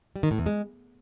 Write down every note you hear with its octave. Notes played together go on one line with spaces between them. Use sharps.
G3
D#3
A2
E2
G#3